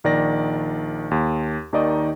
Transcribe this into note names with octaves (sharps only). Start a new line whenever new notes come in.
A#1 D#3 D5 A#6
D#2
D#2 D#3 D#4 D5 D#5 C#6